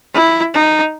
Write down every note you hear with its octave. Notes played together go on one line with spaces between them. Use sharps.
E4
D#4